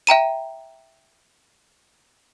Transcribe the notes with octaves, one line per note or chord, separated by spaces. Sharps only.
E5 G5 A#5 D#7